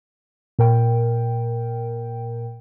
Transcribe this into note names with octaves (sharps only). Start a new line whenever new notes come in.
A#2 A#4 G5